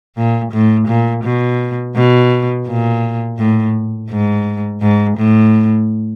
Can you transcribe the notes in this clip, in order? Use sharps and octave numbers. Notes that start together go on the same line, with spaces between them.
A#2
A2
A#2
B2
B2
A#2
A2
G#2
G#2
A2